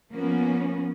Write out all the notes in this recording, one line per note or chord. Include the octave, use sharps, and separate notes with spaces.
F3 A#3 B3 C#4